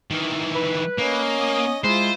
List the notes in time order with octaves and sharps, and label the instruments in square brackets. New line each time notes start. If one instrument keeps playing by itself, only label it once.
[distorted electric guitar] D#3 E3
[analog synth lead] B4
[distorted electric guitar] A#3 [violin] C#4 D#5
[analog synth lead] D#6
[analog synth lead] G#3 [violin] E4 F4 [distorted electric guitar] C5